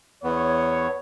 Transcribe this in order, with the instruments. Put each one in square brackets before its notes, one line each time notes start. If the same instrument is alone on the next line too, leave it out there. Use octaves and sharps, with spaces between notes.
[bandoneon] E2 B3 [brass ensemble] C#5